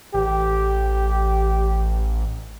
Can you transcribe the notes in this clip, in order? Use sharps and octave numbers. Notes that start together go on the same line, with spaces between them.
A1 G4